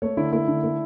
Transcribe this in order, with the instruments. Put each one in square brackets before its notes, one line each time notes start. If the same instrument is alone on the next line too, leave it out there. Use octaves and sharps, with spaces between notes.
[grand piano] A3 C#5
D3 E4
A3 E4
D3
A3